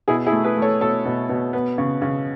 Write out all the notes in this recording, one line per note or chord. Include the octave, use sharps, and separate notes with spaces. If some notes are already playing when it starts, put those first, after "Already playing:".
B2 E4 G#4
E4 G#4
A3
G#4 B4
A3
A4 C#5
B2 A4 C#5
B2
B2
B3
C#3
C#3